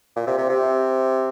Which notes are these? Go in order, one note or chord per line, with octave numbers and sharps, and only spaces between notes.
A#2
C3
C3
C3